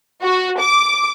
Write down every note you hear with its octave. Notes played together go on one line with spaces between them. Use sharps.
F#4
D6